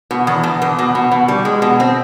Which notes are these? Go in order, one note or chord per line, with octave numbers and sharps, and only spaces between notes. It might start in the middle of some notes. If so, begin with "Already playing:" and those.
B2
E2
B2
E2
B2
B2
B2
G3
G#3
B2
C4